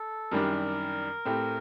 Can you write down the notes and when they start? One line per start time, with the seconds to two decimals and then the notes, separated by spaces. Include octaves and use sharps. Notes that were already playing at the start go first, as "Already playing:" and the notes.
Already playing: A4
0.31 F#2 D#3 G3 D4 A#4
1.25 A2 A3 C4 G4